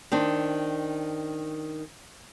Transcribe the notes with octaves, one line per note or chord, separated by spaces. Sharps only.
D#3 C4 D4